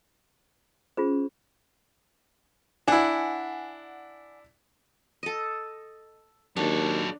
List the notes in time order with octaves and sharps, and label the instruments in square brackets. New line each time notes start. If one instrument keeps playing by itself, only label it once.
[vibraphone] C#4 [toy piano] F4 G#4 C5
[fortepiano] D4 E4 [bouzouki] F#5 G#5
[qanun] A4 D#5
[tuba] D#2 [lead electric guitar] F#3 A4 [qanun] D4